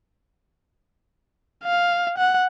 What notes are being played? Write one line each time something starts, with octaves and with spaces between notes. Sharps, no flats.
F5
F#5